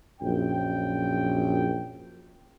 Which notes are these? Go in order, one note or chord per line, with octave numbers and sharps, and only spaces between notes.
A#1 F#2 G5